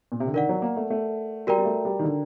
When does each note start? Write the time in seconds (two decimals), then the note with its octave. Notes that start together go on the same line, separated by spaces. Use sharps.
0.12 A#2
0.20 C3
0.27 D3
0.34 D#3 A#4 D5 F#5
0.49 F#3
0.62 A#3
0.77 A3
0.90 A3
1.47 G3 F#4 A#4 D5 G5 A#5
1.58 G3
1.65 A3
1.85 G3
1.99 D#3
2.04 D3